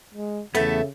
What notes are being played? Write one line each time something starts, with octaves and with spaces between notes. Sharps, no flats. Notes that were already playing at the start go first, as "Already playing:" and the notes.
G#3
E2 C#3 A3 B3 A4 E5